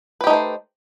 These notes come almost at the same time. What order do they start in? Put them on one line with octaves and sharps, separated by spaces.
B4 G4 D#4 A3 C5